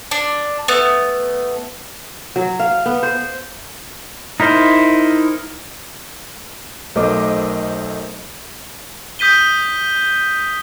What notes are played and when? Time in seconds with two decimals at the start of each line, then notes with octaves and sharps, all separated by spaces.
0.11 D4
0.68 A3 B3
2.36 F#3
2.60 F5
2.86 B3
3.03 C5
4.40 D#4 E4 A#4 C5
6.95 B1 A3 A#4 C5 D#5 D6
9.19 D#6 G6 B6 D#7 G7